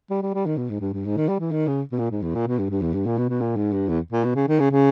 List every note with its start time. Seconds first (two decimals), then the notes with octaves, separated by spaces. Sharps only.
0.10 G3
0.22 G3
0.34 G3
0.46 D#3
0.57 B2
0.70 G#2
0.81 G2
0.93 G2
1.05 G#2
1.17 D#3
1.29 G3
1.40 E3
1.52 D#3
1.68 C#3
1.92 B2
1.99 A#2
2.11 G#2
2.22 E2
2.35 A#2
2.47 B2
2.59 G2
2.70 G2
2.82 E2
2.94 G2
3.06 A#2
3.18 B2
3.29 B2
3.41 A#2
3.56 G#2
3.73 G2
3.89 E2
4.12 A#2
4.24 B2
4.35 C#3
4.48 D#3
4.60 C#3
4.71 C#3